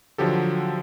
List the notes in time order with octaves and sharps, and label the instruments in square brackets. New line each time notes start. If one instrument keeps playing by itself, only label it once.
[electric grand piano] D3 F3 F#3 G4 A4